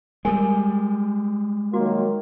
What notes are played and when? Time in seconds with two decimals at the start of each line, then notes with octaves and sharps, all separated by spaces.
0.25 G3 G#3 A#4 G#5
1.73 D#3 F#3 A#3 F#4